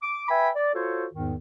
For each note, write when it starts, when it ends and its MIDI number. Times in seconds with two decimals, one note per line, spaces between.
0.02 0.26 86
0.29 0.49 71
0.29 0.49 76
0.29 0.49 79
0.29 0.49 80
0.29 0.49 83
0.55 0.72 74
0.74 1.06 65
0.74 1.06 66
0.74 1.06 69
0.74 1.06 72
0.74 1.06 73
1.13 1.35 40
1.13 1.35 44
1.13 1.35 51